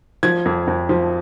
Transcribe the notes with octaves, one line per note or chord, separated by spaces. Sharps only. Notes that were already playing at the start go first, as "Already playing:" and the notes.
F3 G#6
F2
F2
F3